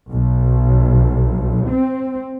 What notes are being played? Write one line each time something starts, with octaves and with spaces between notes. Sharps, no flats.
B1
C4